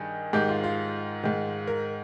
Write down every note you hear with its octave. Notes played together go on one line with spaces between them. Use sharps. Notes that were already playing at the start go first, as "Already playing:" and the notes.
Already playing: G2 D#3 G#4
G#2 D#3 G4
F4
F4
G#2 D#3
A#4